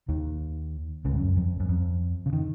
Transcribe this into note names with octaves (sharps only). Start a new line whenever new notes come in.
D#2 D#3
C#2 C#3
G#2
F#2
F2
F#2
F2
C#3
D#3